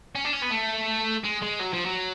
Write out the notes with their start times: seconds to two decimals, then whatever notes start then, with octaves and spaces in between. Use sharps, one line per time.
0.15 C#4
0.25 D4
0.33 C#4
0.42 B3
0.51 A3
1.24 G#3
1.42 G#3
1.59 F#3
1.73 F3
1.85 F#3